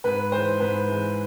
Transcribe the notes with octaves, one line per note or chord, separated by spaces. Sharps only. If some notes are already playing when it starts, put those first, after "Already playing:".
G#2 B4
E3 G#3 C5
G#2 B4
E3 G#3